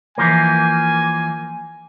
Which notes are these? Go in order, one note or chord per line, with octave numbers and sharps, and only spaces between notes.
E3 F3 A#3 G#5